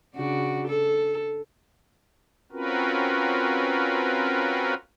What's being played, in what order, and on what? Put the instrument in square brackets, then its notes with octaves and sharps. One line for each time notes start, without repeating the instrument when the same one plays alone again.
[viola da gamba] C#3 D4 F#4
A4
[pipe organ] C4 C#4 F4 F#4 A#4 B4